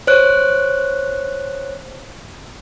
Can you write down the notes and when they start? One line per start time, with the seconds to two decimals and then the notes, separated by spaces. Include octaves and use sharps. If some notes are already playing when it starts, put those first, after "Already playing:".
0.07 C5 C#5 F#6